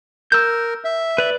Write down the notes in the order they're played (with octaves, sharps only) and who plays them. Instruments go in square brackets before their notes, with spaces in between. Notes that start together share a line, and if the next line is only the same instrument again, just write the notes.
[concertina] A#4 [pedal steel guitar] E6 G6
[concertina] E5
[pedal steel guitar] B4 D5